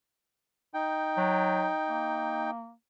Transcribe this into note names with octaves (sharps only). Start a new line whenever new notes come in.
D#4 G5
F#3
A#3